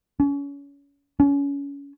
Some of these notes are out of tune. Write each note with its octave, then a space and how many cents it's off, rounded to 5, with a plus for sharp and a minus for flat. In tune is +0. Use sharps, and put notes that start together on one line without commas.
C#4 +30
C#4 +25